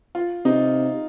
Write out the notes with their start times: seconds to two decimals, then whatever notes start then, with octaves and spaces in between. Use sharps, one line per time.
0.15 F4
0.45 C3 D#4